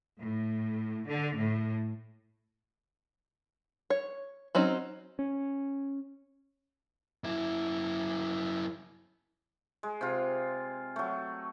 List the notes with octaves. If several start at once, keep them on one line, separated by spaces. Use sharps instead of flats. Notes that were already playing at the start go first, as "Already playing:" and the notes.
A2
D3
A2
C#5
F#3 C4 C#4 D#4
C#4
F#2 E4
G#3
C3 F4
F#3 A3